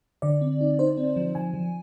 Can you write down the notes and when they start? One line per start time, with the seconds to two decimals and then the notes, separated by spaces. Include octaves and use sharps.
0.22 D3 D5
0.41 C4
0.61 D#4
0.79 D#4 C5
0.97 C4
1.16 F3
1.35 F3 G#5
1.54 F3